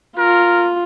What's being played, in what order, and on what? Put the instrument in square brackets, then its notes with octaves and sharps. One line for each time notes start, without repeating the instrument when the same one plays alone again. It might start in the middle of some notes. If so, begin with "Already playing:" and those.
[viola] F4 [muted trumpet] A#4